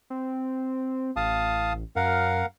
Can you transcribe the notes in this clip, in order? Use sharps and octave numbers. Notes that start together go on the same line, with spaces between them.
C4
A1 F5 A5 D#6
F#2 A#4 F5 F#5